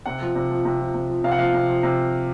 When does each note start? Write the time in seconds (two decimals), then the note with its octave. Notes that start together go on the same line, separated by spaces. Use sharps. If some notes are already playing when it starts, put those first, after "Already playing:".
0.06 C3 F#5
0.21 F3
0.35 C3
0.50 F3
0.65 C3
0.80 F3
0.94 C3
1.09 F3
1.24 C3 F5
1.31 F#5
1.39 F3 F5
1.54 C3
1.69 F3
1.83 C3